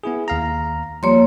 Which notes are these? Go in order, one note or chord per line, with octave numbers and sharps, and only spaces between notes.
B3 E4 G#4
D#2 F5 A#5
F3 G3 A#3 C#5 C6